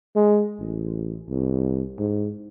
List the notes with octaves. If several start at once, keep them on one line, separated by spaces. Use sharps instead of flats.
G#3
A1
C2
G#2